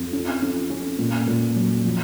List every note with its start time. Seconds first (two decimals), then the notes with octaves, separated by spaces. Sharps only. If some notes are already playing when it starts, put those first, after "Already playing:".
Already playing: F2
0.13 C#4
0.42 C#4
0.70 C#4
0.99 A#2
1.27 A#2
1.56 F#3
1.84 F3